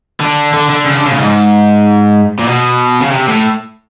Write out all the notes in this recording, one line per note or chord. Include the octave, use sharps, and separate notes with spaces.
D3
D3
D3
C#3
D3
C#3
A2
G#2
A#2
B2
C#3
C3
A2